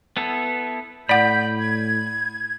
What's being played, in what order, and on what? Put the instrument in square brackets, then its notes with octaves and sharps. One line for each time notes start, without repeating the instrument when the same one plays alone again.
[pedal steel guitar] B3 E4 A4
[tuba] A2 [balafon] D5 F#5 [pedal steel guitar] B5 [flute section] G6
[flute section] G#6